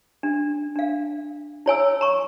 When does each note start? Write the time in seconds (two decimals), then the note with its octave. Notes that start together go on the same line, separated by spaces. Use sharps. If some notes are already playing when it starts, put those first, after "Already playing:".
0.23 D4
0.76 D4 F5
1.66 E4 C#5 G#5 E6
2.01 A#5 C#6